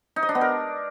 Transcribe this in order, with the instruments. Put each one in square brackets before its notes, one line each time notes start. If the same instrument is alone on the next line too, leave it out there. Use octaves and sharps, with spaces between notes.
[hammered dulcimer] D#4
D#5
D4
B3
A#4